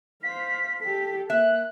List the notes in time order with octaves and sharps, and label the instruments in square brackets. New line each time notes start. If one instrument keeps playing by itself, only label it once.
[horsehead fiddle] C5 F5 [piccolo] B6
[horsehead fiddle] G4 A4 [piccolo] B6
[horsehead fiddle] A#3 [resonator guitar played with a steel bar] E5 [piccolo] F#6